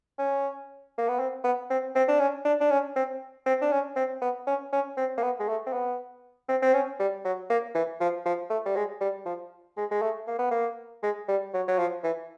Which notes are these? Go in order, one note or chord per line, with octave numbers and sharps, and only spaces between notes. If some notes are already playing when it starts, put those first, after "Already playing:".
C#4
A#3
B3
C4
B3
C4
C4
D4
C#4
D4
D4
C#4
C4
C4
D4
C#4
C4
B3
C#4
C#4
C4
A#3
B3
G#3
A3
C4
B3
C4
C4
C#4
G3
F#3
A#3
E3
F3
F3
A3
G3
G#3
G3
F3
G#3
G#3
A3
A#3
B3
A#3
G#3
G3
F#3
F#3
F3
E3